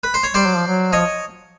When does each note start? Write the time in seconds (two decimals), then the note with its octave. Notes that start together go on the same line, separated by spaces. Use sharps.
0.04 B4
0.14 C5
0.24 C#5
0.34 G3 C5 D5
0.46 F#3
0.57 F3
0.68 F#3
0.93 F3 C#5 D#5